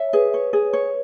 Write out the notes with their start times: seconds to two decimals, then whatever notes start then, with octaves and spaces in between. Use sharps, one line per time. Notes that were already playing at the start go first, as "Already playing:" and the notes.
Already playing: C#5 E5
0.13 G#4 B4
0.33 B4 C#5
0.53 G#4
0.73 C#5